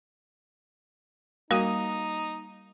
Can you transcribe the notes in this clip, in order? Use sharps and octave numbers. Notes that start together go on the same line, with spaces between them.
G3 A#3 D#4 F#4 D#6 D#7